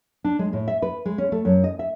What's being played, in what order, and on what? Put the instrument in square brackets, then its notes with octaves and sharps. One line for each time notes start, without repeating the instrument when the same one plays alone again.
[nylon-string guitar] D4
G#3
A2
E5
B4
G#3
C#4
A3
F#2
D#5
E5